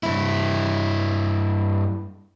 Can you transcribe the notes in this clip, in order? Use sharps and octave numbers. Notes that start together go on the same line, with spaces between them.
G2 E4